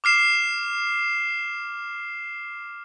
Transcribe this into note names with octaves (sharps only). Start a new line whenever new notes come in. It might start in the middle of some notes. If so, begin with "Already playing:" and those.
D6 F6 C7 E7